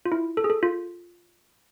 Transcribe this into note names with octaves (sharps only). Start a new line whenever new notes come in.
F4
E4
A4
G#4
A4
F4